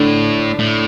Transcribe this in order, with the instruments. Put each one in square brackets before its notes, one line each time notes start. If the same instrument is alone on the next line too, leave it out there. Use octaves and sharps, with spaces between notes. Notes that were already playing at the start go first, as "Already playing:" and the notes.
Already playing: [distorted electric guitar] A2 [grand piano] D3 D4
[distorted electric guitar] A2